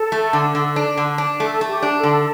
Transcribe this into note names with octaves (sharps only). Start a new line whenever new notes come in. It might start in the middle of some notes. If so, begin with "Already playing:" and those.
Already playing: A4
A3
D3
D3
D4
D3
D4
A3 A4
A3
G4
D4
A4
D3